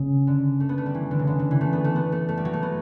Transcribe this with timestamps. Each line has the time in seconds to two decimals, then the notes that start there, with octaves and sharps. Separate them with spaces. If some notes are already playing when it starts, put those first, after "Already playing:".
Already playing: C#3
0.27 D3
0.60 A3
0.69 B3
0.78 A3
0.86 G3
0.94 E3
1.11 D3
1.19 C#3
1.27 D3
1.39 D3
1.51 E3
1.61 A3
1.73 B3
1.84 A3
1.96 B3
2.12 A3
2.29 A3
2.37 G3
2.45 F#3
2.53 A3
2.63 B3